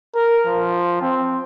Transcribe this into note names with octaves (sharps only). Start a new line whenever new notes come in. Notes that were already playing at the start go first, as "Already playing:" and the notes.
A#4
F3
C4